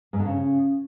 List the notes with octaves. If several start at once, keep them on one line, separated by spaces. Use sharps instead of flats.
G#2
D3
C#3